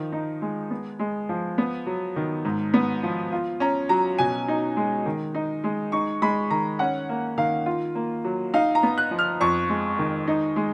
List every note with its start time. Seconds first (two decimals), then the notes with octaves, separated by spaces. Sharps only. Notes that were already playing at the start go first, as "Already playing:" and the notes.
Already playing: D#3 F3
0.12 D#4
0.42 G#3
0.71 B3
0.99 G#3
1.29 F3
1.58 B3
1.86 F#3
2.16 D#3
2.45 G#2
2.74 B3
3.03 F3
3.32 F4
3.60 C#4 A#5
3.89 F#3 A#5
4.19 B2 G#5
4.48 D#4
4.77 G#3
5.06 D#3
5.35 D#4
5.64 G#3
5.92 D#4 C#6
6.22 G#3 B5
6.50 D#3 A#5
6.79 C#4 F#5
7.09 A#3
7.38 D#3 F5
7.66 F4
7.95 A#3
8.24 F#3
8.54 D#4 F5
8.75 A#5
8.83 B3
8.98 F#6
9.11 F3
9.19 F6
9.41 F2 C#6
9.69 G#3
9.99 D#3
10.28 D#4
10.56 G#3